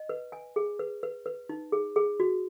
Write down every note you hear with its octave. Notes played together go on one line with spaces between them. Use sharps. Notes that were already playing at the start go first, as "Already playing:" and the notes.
Already playing: D#5
B4
G#5
G#4
B4
B4
B4
D#4
G#4
G#4
F#4